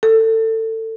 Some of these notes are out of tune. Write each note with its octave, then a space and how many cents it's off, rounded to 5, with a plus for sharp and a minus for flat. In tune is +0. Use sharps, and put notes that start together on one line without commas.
A4 +25